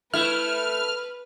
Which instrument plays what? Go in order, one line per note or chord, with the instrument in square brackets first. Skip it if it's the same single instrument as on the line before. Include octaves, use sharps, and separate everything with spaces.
[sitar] A3 E4 [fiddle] B4 [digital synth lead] F6